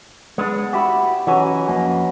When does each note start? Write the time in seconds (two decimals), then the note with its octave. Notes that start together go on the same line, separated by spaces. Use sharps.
0.38 G#3 B3 D4 F#5
0.73 E4 F#4 G4 E5
1.27 E3 F#3 C#4 B4 D#5
1.68 F2 A#3 C#4 D#5